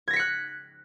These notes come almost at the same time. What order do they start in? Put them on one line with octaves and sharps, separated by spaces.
G#6 A#6 B6 C#7 F#6